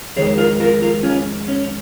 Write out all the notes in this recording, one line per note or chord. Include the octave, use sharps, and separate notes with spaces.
F2 D#3 G#3 G#4 C#5
F4 A#4
F4 A#4
F4 A#4
C#4 F4
C#4